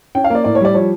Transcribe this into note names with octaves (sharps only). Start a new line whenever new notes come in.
C#4 G5
F5
A#3 D5
A2 D5
C#5
G3 D5
F3 C#5